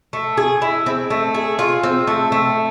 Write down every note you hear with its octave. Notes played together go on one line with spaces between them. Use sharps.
A3
G#4
E4
C4
A3
G#4
F4
C4
A3
A3